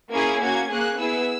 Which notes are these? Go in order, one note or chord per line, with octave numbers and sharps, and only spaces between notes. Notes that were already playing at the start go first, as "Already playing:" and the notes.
A#3 C#4 E4 G#4 G#6
A#3 C#4 F#4 G#6
A#3 C#4 G#4 F#6
B3 E4 G#4 E6